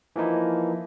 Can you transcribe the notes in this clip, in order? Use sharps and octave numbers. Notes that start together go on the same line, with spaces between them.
E3 F3 A#3 D#4 E4